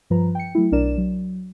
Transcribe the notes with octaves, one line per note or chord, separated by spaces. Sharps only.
G2 F3 B4 A#5
G5 C#7
F#3 A3 E4
B1 D4 A#4 D5 E7
F#3